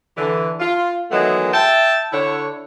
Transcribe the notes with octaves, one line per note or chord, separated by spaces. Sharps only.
D3 E3
F4
D#3 E3 F#3 G#3 A3 B3
E5 G5 A5
D3 E4 C#5